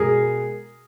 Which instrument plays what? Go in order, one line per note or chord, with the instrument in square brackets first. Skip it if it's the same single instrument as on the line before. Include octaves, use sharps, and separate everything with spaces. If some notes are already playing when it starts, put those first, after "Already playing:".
Already playing: [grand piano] B2 G#3 G#4 A#4